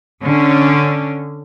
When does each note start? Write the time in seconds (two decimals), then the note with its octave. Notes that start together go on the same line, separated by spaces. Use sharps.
0.24 D3 C#4